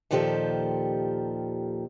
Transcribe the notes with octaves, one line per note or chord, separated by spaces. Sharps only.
D#2 A#2 D#3 F3 G4 A4